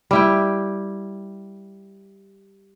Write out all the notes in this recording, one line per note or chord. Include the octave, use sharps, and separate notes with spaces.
G3 E4 G5